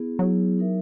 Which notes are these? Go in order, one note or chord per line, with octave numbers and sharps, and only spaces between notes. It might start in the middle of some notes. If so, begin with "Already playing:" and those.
Already playing: B3 E4 G#4
F#3 B3 E4 G#4
D#4 A#4 E5